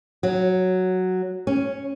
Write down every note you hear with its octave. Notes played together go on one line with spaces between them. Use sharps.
F#3
C#4